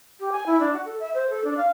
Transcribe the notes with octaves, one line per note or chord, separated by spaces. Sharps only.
G4
G#5
E4
D4
F#4
A4
E5
C5
A4
D4
F5